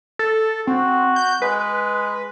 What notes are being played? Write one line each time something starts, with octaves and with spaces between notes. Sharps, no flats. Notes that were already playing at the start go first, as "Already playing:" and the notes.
A4
C4 F#4
G6
G#3 B4